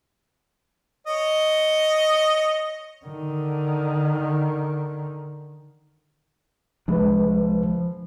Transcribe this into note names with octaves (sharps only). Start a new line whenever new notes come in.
C#5 D#5
D3 D#3
C2 F3 G#3 D4 B4